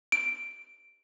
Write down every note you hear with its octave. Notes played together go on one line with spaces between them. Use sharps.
D7